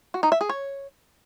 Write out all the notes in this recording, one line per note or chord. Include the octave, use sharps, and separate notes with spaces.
F#4
D#4
E5
G#4
C#5